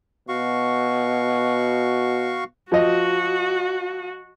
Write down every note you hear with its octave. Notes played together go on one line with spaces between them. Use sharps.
B2 F#4 F5 C#6
F3 F#4 D#5